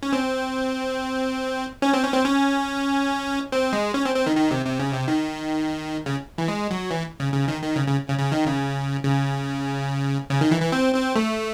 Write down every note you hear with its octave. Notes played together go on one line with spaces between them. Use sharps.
C#4
C4
C#4
C4
C#4
C4
C#4
C4
G#3
C#4
C4
C4
D#3
D#3
C3
C3
C#3
C3
D#3
C#3
E3
G#3
F#3
E3
C#3
C#3
D#3
D#3
C#3
C#3
C#3
C#3
D#3
C#3
C#3
C#3
D#3
E3
E3
C4
C4
A3